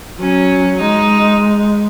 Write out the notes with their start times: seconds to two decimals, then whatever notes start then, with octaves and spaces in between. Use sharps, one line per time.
0.20 F#3 C#4
0.80 G#3 D#4